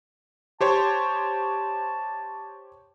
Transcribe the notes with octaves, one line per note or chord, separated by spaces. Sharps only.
G4 C5 C#5 A5